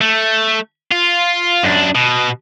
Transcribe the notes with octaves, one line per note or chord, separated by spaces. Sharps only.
A3
F4
F#2 D4
B2